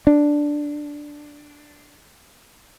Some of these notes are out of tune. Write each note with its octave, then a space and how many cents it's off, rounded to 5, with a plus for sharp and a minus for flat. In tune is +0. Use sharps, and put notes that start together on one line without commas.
D4 +0